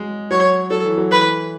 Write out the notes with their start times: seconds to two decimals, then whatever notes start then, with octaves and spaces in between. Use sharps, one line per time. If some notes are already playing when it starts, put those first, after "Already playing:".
Already playing: F#3 G#3
0.31 F#3 C#5
0.71 F#3 A4
0.85 E3
0.98 F#3
1.11 E3 B4